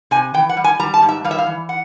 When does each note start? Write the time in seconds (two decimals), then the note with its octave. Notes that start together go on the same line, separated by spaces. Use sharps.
0.11 C3 G#5
0.34 E3 G5
0.49 F#5
0.57 G3
0.64 G#5
0.80 G3 A#5
0.94 A5
1.02 G#2
1.09 E5
1.24 G3 F5
1.31 E5
1.38 F5
1.46 E3
1.69 F#5